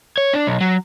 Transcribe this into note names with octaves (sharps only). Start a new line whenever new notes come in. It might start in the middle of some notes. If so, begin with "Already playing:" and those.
C#5
D4
B1
F#3